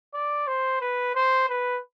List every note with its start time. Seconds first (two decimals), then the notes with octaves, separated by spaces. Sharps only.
0.14 D5
0.47 C5
0.81 B4
1.15 C5
1.49 B4